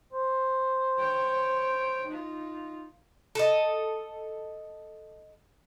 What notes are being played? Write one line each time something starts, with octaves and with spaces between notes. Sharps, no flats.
C5
C#5 G5
D#4 F4
A4 D#5